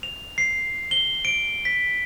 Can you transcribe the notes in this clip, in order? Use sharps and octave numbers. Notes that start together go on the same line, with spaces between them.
F7
C7
G7
D7
B6